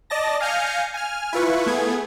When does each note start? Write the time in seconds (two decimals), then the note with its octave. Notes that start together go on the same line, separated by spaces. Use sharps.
0.10 D5 D#5 A5 A#6
0.41 F5 G#5 F6 G6 A#6 C#7
0.94 G#5 F6
1.33 E4 F4 B4 C#6
1.66 A3 B3 G#4 G#6